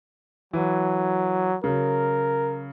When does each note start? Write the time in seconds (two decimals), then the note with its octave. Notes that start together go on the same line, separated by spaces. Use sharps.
0.53 E3 F#3
1.64 C#3 F#3 A#4